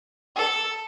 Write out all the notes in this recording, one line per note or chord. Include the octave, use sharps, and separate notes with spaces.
A4